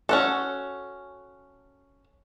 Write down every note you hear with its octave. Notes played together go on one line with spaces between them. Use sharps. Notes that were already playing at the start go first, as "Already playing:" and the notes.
C#4 F#4 A4